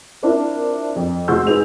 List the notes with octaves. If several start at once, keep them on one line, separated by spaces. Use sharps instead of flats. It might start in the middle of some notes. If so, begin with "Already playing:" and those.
C4 D4 E4 F4 A#4
F2
F1 G#3 F#4 C6 E6 G6
G#2 G#4 B4 F7